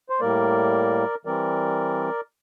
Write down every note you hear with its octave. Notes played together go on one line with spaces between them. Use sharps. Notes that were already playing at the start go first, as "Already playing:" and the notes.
C5
A2 G3 A#3 A#4 D5
E3 G3 C4 A#4 D5